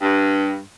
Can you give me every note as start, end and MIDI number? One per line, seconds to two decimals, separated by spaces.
0.02 0.60 43